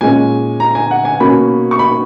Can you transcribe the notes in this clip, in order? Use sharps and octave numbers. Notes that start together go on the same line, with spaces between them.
A#2 G#3 C#4 G#5
A#5
G#5
F#5
G#5
B2 A#3 C#4 B5
C#6
B5